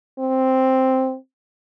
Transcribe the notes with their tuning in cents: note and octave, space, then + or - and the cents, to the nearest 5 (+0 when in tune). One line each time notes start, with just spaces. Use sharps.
C4 +0